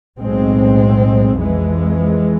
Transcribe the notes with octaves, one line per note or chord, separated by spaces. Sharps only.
B1 A2 G#3 C4
F2 E3 G#3